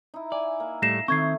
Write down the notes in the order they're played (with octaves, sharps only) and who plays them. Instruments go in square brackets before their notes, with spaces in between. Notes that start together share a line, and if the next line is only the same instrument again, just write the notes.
[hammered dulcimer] D#4 E4
[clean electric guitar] D5 [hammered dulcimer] G#5
[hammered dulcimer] A#3
[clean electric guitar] A2 G3 A3 [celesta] A#6 C7 E7
[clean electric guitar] D#3 C4 [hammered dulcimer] A3 [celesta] C#6 G#6 C7